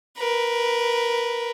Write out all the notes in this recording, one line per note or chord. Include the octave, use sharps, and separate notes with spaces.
A#4 B4